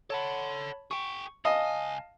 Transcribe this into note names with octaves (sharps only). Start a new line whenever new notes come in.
A4 C#5 F#5 A5 B5
G#4 G5 C#6
C#2 D#5 F5 G#5 A5